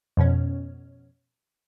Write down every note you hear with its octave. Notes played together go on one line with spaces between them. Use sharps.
F2 B2 C#4